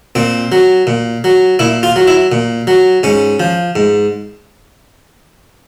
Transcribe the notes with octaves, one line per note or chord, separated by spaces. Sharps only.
A#2 C4
F#3
A#2
F#3
A#2 E4
F4
F#3
E4
A#2
F#3
G#2 C#4
F3
G#2